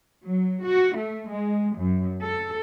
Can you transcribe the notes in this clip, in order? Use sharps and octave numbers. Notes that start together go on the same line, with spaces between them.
F#3
F#4
A3
G#3
F#2
A4